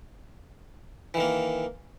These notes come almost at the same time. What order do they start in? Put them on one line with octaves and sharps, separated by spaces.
E3 D#3 A#3